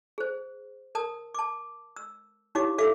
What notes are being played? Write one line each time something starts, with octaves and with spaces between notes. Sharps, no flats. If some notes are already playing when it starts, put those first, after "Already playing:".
G#4 C5
A#4 A5 D#6
A5 D6
E6
D#4 E4 G4 C#5 F5 D6
A4 E5 F5 D6